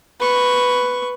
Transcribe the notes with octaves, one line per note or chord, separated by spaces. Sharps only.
B4 C#6